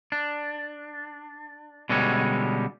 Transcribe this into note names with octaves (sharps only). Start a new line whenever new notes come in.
D4
B2 D3 G3 G#3 C#4